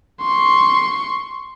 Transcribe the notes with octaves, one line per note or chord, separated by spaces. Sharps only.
C6 C#6